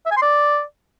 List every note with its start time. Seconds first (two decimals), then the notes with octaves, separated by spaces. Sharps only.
0.06 E5
0.11 G#5
0.17 C6
0.22 D5